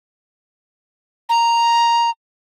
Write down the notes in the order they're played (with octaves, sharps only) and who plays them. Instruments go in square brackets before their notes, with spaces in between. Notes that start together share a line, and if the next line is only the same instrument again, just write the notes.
[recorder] A#5